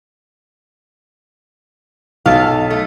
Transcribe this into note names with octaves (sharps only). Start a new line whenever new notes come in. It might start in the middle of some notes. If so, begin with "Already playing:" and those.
B1 A4 F5
A3